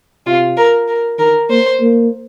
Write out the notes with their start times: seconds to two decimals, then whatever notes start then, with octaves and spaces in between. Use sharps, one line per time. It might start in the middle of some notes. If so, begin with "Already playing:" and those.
0.26 C3 F4
0.57 A#4
0.88 A#4
1.19 D#3 A#4
1.50 A#3 C5
1.81 A#3